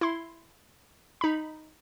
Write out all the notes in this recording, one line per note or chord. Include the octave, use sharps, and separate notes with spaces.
E4 C6
D#4 B5